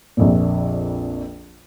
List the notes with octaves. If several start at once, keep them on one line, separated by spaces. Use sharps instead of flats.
A#1 F2 A#2